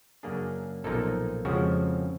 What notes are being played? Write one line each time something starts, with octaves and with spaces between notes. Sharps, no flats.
F#2 C#3 F#3 A#3 D4 G#4
B1 A#2 F3 A#3 D#4 A4
F2 C#3 F3 G#3 F#4